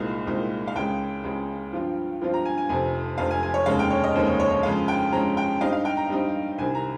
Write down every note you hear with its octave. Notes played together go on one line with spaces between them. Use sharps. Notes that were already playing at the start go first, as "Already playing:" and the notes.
Already playing: C2 A#2 G#3 C4 D#4 F5
C2 A#2 G#3 C4 D#4
F5
C#2 C#3 G#3 G5
C#2 C#3 G#3
G2 F3 C4 F4
G2 F3 C4 F4
A#5
G#5
G#5
F1 F2 C3 G#5
F1 F2 C3 F5
G#5
G#5
C#5
F1 D#2 C#3 G#3 F5
G5
C#5
D#5
F1 D#2 C#3 G#3 C5
C#5
C#5
C#5
F2 C#3 G#3 C#4 F5
G5
F2 C#3 G#3 C#4 A#5
G5
G2 G3 C4 D#4 F5
F5
G5
A#5
G2 G3 C4 D#4
C2 C3 D#3 G#5
A#5